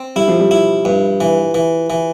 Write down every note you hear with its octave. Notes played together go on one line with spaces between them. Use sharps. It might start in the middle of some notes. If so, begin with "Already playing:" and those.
Already playing: C4
G3 E4
F3
G3
E4
G2
E3
E3
E3